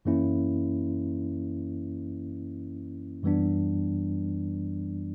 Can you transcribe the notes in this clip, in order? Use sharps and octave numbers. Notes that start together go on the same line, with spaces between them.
F#2 E3 A#3 C#4 E4
F#2 E3 G3 B3 D4